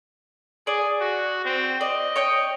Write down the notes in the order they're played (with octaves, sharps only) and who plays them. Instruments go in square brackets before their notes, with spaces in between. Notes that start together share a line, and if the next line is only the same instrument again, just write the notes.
[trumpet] G#4 [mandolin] D5
[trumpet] F#4
C4
[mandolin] D5 [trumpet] D#5
[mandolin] C#5 G5